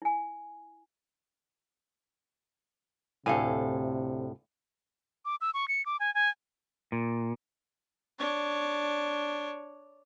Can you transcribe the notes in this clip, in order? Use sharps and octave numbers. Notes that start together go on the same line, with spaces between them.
E4 G#5
D2 A2 C3 A4 F5 G#5
D6
E6
C#6
C#7
D6
G#5
G#5
A#2
D4 C#5